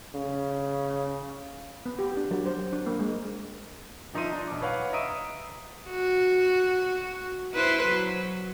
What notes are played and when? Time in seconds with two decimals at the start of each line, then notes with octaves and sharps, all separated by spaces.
0.15 C#3
1.86 B3
1.99 G4
2.17 D4
2.31 F#3
2.46 C5
2.73 D4
2.86 A#3
2.99 G#3
4.14 G1 F3 D#4 E5 C6 D#7
4.32 D4
4.47 B1 D6
4.61 B4 C#5 F5 F#5
4.93 D#5 E5 A#5 D#6 D7 D#7
5.90 F#4
7.53 E4 B4 C5
7.84 F#3